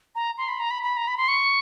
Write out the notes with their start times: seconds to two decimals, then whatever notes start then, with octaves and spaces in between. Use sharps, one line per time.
0.15 A#5
0.38 C6
0.48 B5
0.60 A#5
0.71 B5
0.83 B5
0.97 A#5
1.08 B5
1.18 C6
1.28 C#6